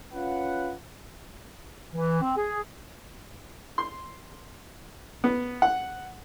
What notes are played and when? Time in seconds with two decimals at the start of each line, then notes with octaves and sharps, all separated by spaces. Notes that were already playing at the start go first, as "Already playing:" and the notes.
0.13 C#4 F4 B4 F#5
1.93 E3
2.21 C4
2.37 G#4
3.78 C6
5.24 B3
5.62 F#5